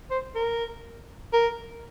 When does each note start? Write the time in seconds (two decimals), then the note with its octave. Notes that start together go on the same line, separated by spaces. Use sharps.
0.11 C5
0.35 A#4
1.33 A#4